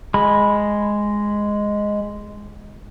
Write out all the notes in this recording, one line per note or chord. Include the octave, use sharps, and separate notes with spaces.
G#3 B5